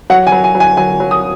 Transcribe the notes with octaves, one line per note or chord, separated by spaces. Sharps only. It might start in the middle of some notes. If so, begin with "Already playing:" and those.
F#3 F#5
G#5
F#3
G#5
F#3
G#5
F#3 G#5
F#3
D#6